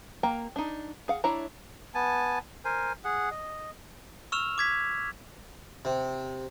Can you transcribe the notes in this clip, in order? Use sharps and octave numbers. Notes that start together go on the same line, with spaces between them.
A#3 G5 A#5
D4 D#4
G#4 F5 F#5
D4 E4 C#5 A#5
B3 G#5 A5
A#4 C5 G#5
G#4 F#5
D#5
C#6 E6 F6 E7 F7
D6 G#6 B6
C3